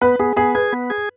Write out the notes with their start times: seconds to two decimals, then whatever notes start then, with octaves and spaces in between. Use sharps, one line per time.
0.02 B3 B4
0.20 B3 G#4
0.36 B3 G#4
0.55 G#4 B4
0.73 B3
0.90 G#4